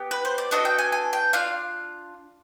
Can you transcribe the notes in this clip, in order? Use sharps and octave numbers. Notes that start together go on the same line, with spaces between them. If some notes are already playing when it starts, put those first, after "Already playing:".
Already playing: B3 G4
B4
C5
D5
B3 D4 F#4 A4 D#5
G5
G#5
G#5
G5
D4 F4 F5